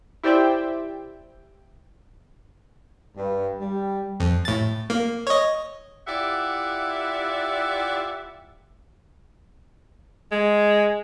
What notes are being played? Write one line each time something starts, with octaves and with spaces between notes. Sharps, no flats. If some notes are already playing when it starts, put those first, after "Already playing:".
E4 G4 C5 D5 E5 G5
G2
G3
F2
A2 A6
A#3
C#5 D#5
E4 F4 G4 D5 E5 F#5
G#3